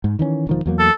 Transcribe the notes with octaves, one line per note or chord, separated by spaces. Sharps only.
G#2
D#3 E3 C#4
E1 D#3 F3
E2 F#3 A#3
A4